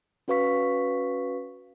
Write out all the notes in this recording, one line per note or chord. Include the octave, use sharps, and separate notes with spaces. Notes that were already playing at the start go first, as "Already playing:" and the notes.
C#4 F#4 B4 F5 C#6 B6